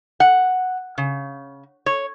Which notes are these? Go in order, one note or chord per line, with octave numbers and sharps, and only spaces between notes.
F#5
C#3
C#5